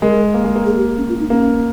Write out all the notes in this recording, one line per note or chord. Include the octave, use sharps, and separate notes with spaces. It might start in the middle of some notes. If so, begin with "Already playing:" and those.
G#3 A#4
A#3
G#3
A#3
G#4
G4
C#4
F4
D#4
A#3 C#4